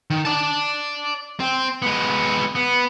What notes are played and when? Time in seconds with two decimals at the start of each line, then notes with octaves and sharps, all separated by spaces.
0.10 D#3
0.25 D5 A5
1.40 C4
1.82 G#3 B3
2.55 B3